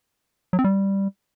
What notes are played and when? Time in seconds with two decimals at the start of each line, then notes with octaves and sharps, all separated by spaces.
0.53 F#3
0.59 C4
0.64 G3